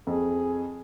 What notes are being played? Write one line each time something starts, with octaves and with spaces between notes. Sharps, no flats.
F2 G#4